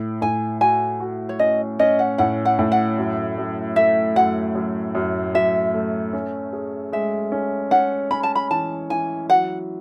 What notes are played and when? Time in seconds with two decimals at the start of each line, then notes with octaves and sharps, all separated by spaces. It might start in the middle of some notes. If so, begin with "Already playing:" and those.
Already playing: A2
0.22 A2 G#5
0.61 F#4 G#5
1.00 F#4
1.29 C#5
1.39 C#4 D#5
1.79 C#4 D#5
1.99 F#5
2.18 A2 F#5
2.45 F#5
2.59 A2
2.72 F#5
2.98 F#2
3.38 F#2
3.76 A3 E5
4.16 F#2 F#5
4.55 F#2
4.95 F#2
5.34 F#2 E5
5.74 A3
6.13 C#4
6.53 G#4
6.92 G#3 E5
7.32 C#4
7.71 C#4 F#5
8.11 C#4 B5
8.23 A5
8.35 B5
8.51 E3 A5
8.90 E3 G#5
9.30 F#3 F#5